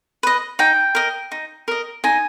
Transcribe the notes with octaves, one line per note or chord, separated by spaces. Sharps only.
B4 D#5
D#4 G5
A#4 D#5
D#4
A#4 D#5
D#4 G#5